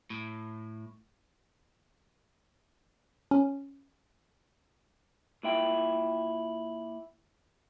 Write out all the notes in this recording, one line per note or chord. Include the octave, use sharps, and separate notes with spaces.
A2
C#4
A#2 E4 G5